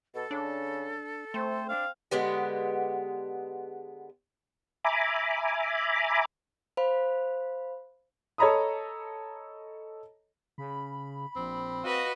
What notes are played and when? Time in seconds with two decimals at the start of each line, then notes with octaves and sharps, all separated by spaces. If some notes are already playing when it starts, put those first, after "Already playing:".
0.15 B2 A4
0.31 C#3 D4
1.34 A3 C4 C5
1.69 D4 F5
2.11 D3 G#3 B3 G4
4.85 E5 G#5 A#5 B5 D6
6.77 C5 F5 B5
8.38 A4 C#5 D#5 A#5 B5 D#6
10.58 C#3 B5
11.36 A#1 C4
11.84 F#4 B4 D#5 F5